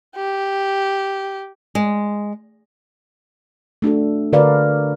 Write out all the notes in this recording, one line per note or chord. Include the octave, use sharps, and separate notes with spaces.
G4
G#3
A3 D4 F#4 A4
D3 F#4 A#4 B4 D5 F5